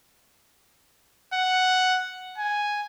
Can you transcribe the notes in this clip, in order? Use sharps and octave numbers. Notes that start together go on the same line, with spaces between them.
F#5
G#5